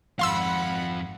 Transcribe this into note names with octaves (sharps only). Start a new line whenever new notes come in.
G#1 F2 F4 F5 F#5 B5 C6 E6